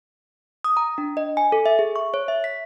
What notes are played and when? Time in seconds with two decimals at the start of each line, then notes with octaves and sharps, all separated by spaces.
0.64 D#6
0.77 A#5
0.98 D4
1.17 D#5
1.37 G#5
1.52 A4
1.66 E5
1.79 G#4
1.96 C#6
2.14 C#5
2.28 E5
2.44 B6